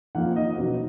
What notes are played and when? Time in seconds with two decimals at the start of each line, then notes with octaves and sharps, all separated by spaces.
0.15 F2 F3 A#3 D#4 F#5
0.36 D#5
0.58 B2 F#3 B3 D#4